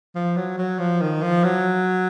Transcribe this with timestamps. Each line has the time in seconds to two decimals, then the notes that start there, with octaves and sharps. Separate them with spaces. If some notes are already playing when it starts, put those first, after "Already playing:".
0.16 F3
0.37 F#3
0.58 F#3
0.79 F3
1.01 D#3
1.22 F3
1.44 F#3